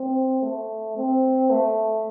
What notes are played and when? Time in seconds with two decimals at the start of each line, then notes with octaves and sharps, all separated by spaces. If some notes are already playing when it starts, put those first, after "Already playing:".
Already playing: C4
0.43 A3
0.97 C4
1.50 A3